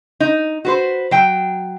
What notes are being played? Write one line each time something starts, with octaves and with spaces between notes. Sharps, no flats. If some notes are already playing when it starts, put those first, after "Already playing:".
D#4
F#4 B4 C5
F#3 G5